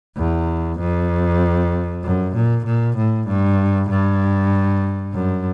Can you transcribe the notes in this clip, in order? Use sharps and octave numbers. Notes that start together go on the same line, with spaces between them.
E2
F2
F#2
A#2
A#2
A2
G2
G2
F#2